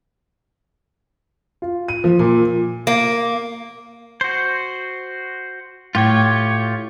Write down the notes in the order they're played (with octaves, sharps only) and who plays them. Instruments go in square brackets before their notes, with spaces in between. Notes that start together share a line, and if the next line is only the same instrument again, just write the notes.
[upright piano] F4
D#7
F3
A#2
[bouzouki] A#3
[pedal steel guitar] F#4 C5
[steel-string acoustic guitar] A2 [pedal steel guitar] F4 G4 C#5